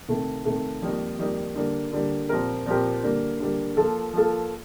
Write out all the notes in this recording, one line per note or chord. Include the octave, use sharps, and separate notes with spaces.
C3 D#3 A3
C3 D#3 A3
F2 D#3 G3 A#3 D#4
F2 D#3 G3 A#3 D#4
D3 G3 A#3
D3 G3 A#3
A#2 F3 C4 G4 A#4
A#2 F3 C4 G4 A#4
D3 G3 A#3
D3 G3 A#3
F3 A#3 F4 A4
F3 A#3 F4 A4